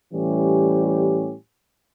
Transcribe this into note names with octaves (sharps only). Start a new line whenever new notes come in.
A2 E3 G3 C#4 G4